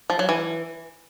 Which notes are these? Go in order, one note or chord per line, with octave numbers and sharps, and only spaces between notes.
F3
F#3
E3